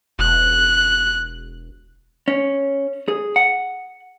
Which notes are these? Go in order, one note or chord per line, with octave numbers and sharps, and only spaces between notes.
E1 F#6
C#4
G#4
F#5